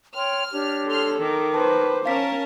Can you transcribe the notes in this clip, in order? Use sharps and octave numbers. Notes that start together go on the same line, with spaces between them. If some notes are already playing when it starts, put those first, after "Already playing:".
C#5 G5 C6 F6
D4 G4 C#5
A4 C6 F6
D#3 D6
B4 C5 A5
C#4 A#4 C#5 F5 A5 B6